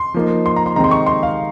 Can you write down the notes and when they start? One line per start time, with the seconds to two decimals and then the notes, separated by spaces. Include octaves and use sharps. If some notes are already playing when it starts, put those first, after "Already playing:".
Already playing: C6
0.14 F3 A#3 D#4
0.46 C6
0.56 A#5
0.66 C6
0.76 C3 D#3 G#3 C4 D#4 A#5
0.84 C6
0.91 C#6
1.06 C6
1.23 F5